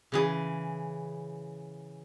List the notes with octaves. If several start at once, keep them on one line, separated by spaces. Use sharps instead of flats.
C#3 E3 G#4